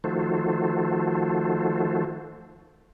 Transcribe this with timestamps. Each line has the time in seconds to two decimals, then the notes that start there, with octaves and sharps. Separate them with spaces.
0.04 D#3 F3 A3 F#4 A4 C5